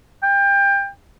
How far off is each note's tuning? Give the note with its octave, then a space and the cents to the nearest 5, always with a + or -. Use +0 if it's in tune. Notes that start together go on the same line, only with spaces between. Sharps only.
G5 +25